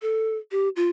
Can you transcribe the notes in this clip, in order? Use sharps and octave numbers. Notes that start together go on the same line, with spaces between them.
A4
G4
F4